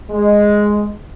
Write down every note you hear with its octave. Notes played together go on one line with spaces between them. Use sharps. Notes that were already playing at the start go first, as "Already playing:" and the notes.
G#3